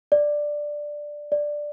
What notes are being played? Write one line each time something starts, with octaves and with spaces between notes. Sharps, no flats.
D5
D5